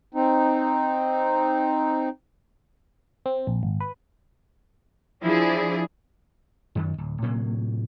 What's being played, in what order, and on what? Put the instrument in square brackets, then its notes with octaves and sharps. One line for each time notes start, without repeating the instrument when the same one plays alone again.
[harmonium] C4 D#4
[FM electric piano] C4
A#1
G#1
B4
[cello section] F3 D4 E4 G#4
[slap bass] F#2 D#3
D1
A2 C3 F#3 A#3